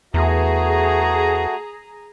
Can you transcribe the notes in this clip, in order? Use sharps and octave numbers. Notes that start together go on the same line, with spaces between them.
E2 A3 F#4 G#4 A#5